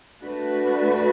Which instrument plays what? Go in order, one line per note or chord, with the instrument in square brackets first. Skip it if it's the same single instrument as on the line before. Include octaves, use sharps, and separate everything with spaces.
[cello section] A3 D4 F#4 B4